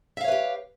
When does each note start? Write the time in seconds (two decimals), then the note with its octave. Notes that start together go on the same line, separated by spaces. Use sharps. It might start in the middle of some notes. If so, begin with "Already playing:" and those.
0.17 E5
0.21 F5
0.24 C#5
0.28 B4
0.32 G4